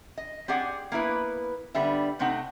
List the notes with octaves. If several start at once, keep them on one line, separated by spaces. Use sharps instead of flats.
D#5
C4 G4 G#4 D5 F#5
A#3 B3 E4 B4
D3 G3 B3 E5
C3 A3 C4 D#4 F#5